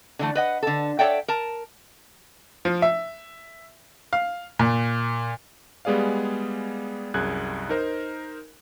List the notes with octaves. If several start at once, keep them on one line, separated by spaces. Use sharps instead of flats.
D3 E3 A3
B4 D#5 F#5
D3 A4
A4 C#5 D5 E5 F#5 G5
A#4 A5
F3
E5
F5
A#2
G3 G#3 B3 G#4 D5 F5
C2 F#2 G#4 F#6 G#6
D#4 A#4 C5